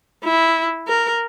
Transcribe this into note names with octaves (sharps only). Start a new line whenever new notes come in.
E4
A#4